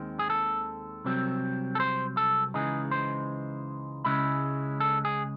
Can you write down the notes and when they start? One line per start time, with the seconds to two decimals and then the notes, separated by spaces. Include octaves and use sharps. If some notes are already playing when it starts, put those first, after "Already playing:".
Already playing: D#2 D#3 G#3 C4
0.19 G#4
0.30 A4
1.05 C2 C3 F#3 C4
1.75 A4
1.80 C5
2.17 A4
2.54 C#2 C#3 E3 G#3 D#4 G#4
2.91 C5
4.05 C#2 C#3 G#3 C#4 E4
4.80 A4
5.05 G#4